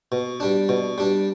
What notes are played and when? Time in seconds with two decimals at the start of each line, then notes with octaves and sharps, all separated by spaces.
0.12 B2
0.40 G3 D4
0.69 B2
0.98 G3 D4